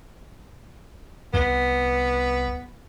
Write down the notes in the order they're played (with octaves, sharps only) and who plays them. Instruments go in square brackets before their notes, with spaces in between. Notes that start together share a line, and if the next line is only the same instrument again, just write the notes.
[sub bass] C2 [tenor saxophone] B3